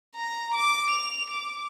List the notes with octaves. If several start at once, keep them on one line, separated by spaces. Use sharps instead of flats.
A#5
D6
F7
D6